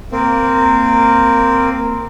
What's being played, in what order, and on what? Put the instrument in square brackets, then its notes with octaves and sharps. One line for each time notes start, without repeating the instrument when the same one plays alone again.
[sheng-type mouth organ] A#3 C4